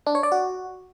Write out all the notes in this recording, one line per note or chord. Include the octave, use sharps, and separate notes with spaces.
D4
C#5
D5
F#4